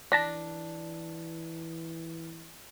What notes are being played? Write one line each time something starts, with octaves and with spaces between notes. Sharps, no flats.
E3 D4 A5 A#6 B6